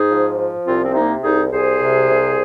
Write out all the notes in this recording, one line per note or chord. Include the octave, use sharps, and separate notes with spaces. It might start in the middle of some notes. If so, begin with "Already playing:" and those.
Already playing: G#2 D#4 G#4
F3
F3
C2 C4 F4
C4
C3 A#3 D#4
C2 D#4 G#4
C2 G#4 C5
C3
C2